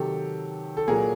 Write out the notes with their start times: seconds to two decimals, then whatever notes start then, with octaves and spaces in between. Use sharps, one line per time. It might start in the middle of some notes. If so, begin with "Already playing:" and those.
Already playing: C3 D#3 F#3 G4 A4
0.77 A4
0.88 A#2 F#3 G#4 A#4